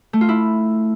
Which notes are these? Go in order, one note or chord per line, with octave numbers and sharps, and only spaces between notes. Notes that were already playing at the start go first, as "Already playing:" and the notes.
A3
F4
E4